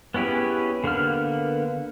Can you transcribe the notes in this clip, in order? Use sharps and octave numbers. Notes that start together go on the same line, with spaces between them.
B3 C#4 E4 G4 G#4
D3 A#3 B3 F6